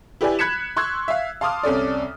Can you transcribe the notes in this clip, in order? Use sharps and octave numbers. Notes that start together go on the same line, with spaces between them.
E4 G4 B4 D5 G#5
B5 F#6 G#6 B6 C#7 E7
C6 C#6 E6 F#6 G#6
E5 F5
F5 A5 C6 D6 D#6 F6
C2 C#4 A4 D5